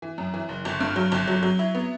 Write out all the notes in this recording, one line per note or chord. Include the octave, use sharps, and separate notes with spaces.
E3
F#2
E3
F#1
G1
G2
F#3
G1
F#3
F#3
E4
B3